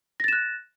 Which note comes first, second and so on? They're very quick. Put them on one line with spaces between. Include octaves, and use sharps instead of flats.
A#6 A6 E7 F#6